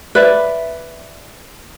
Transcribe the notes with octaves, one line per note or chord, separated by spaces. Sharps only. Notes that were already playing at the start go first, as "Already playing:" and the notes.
B4 D5 E5